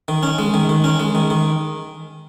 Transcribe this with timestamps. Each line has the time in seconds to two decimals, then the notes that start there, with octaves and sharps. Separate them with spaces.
0.08 D#3
0.23 C#4
0.38 G#3
0.54 D#3
0.69 D#3
0.84 C#4
0.99 G#3
1.15 D#3
1.30 D#3